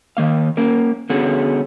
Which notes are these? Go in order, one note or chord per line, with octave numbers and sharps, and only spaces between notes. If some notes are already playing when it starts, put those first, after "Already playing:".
D#3 A#3 F5
A#3 C#4 A#4
D3 B3 C#4 F#4 G#4